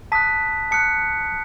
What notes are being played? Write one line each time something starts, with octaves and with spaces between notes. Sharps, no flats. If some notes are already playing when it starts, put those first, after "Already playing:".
A5 D#6 F#6 B6
A5 D#6 F#6 C#7